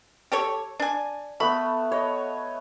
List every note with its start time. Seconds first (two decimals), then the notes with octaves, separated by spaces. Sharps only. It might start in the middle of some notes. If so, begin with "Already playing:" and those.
0.32 G4 A4 C#5
0.80 D4 G#5
1.40 A3 B3 B5
1.92 C#5 D#5